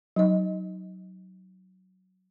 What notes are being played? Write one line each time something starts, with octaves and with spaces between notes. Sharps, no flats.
F#3 D#4 D#5